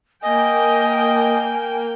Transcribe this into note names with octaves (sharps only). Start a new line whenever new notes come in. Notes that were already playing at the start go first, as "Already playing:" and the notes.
A#3 D#5 G5 G#5